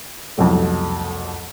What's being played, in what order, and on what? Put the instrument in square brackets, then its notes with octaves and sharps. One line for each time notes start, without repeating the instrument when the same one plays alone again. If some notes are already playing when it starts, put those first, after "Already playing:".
[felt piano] C2 F2 B2 F#3 A3